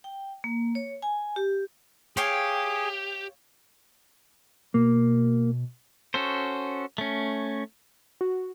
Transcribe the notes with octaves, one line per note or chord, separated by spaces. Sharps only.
G5
A#3
C#5
G#5
G4
G4 G#4 C#5 F5 G5
B2 A#3
C#4 F#4 A4 C5
A3 C#4
F#4